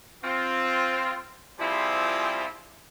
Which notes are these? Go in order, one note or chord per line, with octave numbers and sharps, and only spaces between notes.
C4 F4
F3 G3 C4 E4 F4 G#4